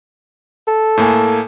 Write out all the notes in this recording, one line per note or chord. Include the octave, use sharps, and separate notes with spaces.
A4
A2 A#3 G#5